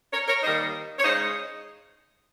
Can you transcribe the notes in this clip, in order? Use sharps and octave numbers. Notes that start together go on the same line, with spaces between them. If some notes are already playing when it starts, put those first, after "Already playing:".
A#4 C#5
A#4 C#5
D#3 G3 A#3 D#4 C5 D#5
C#5
C#3 G#3 D#4 C5 D#5